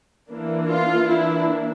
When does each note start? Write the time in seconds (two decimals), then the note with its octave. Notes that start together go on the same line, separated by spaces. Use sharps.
0.29 E3 A#3 D4
0.69 F4
1.07 E3 A#3 D4 E4